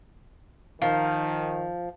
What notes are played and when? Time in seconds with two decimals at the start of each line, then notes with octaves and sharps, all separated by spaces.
0.82 D#3 F3